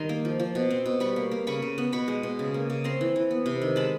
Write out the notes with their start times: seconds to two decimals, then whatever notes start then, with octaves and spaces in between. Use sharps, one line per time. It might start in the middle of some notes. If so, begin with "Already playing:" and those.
Already playing: D#3 G3 A#5 C6
0.09 A#3
0.25 F3
0.40 F3
0.55 B2
0.71 C4
0.86 B2
1.00 G3 B5 C#6
1.16 A#3
1.31 A#3
1.47 C#3 B5 C#6
1.62 C#3
1.78 B3
1.93 B2 B5 C#6
2.08 G#3
2.23 B2
2.39 C#3
2.54 A#3
2.70 C#3
2.84 C4 A#5 C6
3.01 E3
3.16 E3
3.31 B3
3.46 C3
3.62 D#3
3.76 G#3 A5 B5